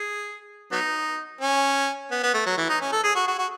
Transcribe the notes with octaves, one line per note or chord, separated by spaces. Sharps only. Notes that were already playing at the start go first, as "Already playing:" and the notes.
Already playing: G#4
F#3 B3 D#4
C#4
B3
B3
A3
F#3
E3
D#4
C#4
A4
G#4
F#4
F#4
F#4